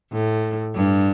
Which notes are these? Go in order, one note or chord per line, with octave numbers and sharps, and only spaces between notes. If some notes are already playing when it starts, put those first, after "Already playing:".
A2
G2